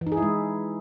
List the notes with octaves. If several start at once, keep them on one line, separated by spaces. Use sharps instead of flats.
E3
D#4
G#4
E4
G#3